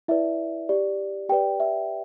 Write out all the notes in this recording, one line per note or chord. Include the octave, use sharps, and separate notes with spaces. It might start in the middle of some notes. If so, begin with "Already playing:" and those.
E4 B4 D5 E5
G4 D5
G4 B4 D5 G5
E5